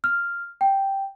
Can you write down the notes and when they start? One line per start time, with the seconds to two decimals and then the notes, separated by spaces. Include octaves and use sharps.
0.04 F6
0.61 G5